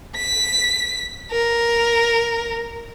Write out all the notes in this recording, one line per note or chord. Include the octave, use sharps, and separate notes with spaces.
B6
A#4